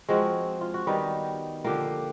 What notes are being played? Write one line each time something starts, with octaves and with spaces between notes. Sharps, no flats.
F3 G#3 C4 F#4
F4
F#4
D#3 G3 B3 D#4
D3 F3 A#3 G4